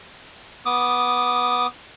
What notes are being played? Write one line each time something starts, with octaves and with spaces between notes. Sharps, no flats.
B3 D6 D#6